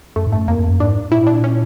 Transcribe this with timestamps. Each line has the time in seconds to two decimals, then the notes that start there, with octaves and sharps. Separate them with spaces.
0.16 F#2 A3
0.27 G#2
0.32 F#2 A3
0.48 F2 A#3
0.58 F2
0.69 F#2
0.80 G#2 D4
1.11 A#2 E4
1.27 D4
1.44 C#4